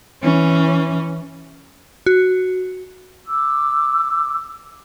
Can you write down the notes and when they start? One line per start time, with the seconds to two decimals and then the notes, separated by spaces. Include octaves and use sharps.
0.22 E3 C#4
2.06 F#4
3.25 D6 E6